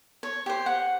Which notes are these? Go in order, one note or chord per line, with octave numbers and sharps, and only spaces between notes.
C#5
G4 C5
F#5